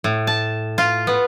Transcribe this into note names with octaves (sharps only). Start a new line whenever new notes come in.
A2
A5
F4
B3